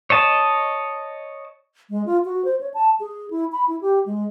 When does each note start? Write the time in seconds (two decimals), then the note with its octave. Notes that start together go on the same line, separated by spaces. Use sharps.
0.10 C#5 D#5 A5
1.90 G#3
2.06 F4
2.25 F#4
2.45 C5
2.61 C#5
2.74 A5
3.00 G#4
3.30 E4
3.52 B5
3.68 E4
3.81 G4
4.06 G#3